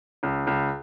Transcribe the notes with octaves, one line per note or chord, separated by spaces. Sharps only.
C#2
C#2